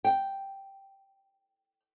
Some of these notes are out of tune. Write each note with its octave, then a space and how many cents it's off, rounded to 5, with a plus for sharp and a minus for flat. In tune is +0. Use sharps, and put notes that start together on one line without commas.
G5 -5